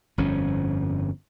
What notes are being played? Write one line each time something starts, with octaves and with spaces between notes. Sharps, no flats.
G1 F2 F3 C#4